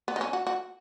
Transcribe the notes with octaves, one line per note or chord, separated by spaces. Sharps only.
B3
D#4
C#4
F#4
F#4